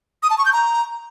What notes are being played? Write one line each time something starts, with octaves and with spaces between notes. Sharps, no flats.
D#6
A5
C#6
G6
A#5